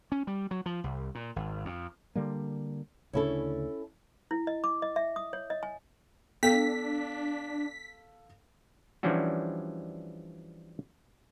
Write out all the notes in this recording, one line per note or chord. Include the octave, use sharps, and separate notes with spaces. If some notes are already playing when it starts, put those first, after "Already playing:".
C#4
G3
F#3
F3
C2
A#2
G#1
F2
D3 G3 A#3
D2 C#3 C#4 D4 E4 A4
E4
D#5
D6
D#5
E5
D#6
C#5
D#5
G#5
B3 D4 A4 F5 B6
E3 F3 G3 C#4 D4 F#4